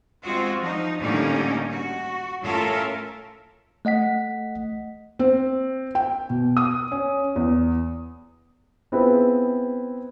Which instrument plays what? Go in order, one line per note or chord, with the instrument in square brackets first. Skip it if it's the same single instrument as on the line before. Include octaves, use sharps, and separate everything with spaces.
[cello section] G#3 C4 F4 F#4
F3 D#4
A2 D3 G3 A#3 C#4 D#4
F#4
A2 C#4 F4 A4 A#4 E5
[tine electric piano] A3 D#5 F#5 B6
[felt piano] C4
G5
B2
D#6
C#4
E2
[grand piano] B3 C4 E4 F4 G#4 B4